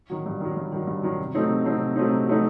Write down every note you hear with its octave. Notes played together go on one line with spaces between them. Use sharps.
D#3 F#3
G2
D#3 F#3
G2
D#3 F#3
G2
D#3 F#3
C3
F#3 A3 C4 D#4
C3
F#3 A3 C4 D#4
C3
F#3 A3 C4 D#4
C3
F#3 A3 C4 D#4